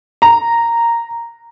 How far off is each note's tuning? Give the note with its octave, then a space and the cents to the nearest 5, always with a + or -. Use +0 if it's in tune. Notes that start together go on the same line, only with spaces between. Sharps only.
A#5 -5